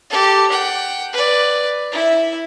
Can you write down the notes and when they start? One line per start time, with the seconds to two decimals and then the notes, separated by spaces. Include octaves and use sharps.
0.10 G4 A4
0.50 F#5 G5
1.13 B4 D5
1.92 E4 E5